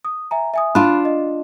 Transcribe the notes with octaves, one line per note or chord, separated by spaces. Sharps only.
D#6
E5 G#5 A#5
E5 G#5 D#6
D4 F4 B5 F#6
D#5